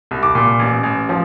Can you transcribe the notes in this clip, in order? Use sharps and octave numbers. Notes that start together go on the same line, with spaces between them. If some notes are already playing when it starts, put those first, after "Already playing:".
C2
D6
A#2
A1
A1
F3